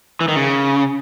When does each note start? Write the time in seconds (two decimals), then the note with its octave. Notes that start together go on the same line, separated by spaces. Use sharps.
0.21 E3
0.28 D#3
0.36 C#3